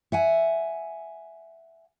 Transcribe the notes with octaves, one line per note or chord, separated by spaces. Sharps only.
E5 F#5 G#5